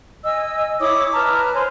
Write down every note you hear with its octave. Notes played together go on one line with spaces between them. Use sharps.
D#5 G#5 E6
E4 C#5 D6 D#6
B4 A5 A#5 F6
C5 C#5 G#5 C6